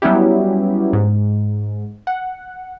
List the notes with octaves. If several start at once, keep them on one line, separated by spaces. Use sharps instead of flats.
F#3 G3 B3 C#4 E4 G4
G#2
F#5